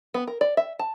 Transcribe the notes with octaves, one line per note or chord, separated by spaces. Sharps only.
B3
A#4
D5
E5
A5